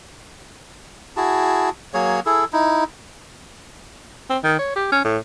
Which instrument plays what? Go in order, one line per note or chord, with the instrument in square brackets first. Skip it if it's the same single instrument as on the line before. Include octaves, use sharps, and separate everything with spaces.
[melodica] E4 F#4 G#4 A5
F#3 A#3 G#4 C#5
E4 G#4 A4
D#4 E4
[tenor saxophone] C4
D#3
C#5
G4
C#4
A2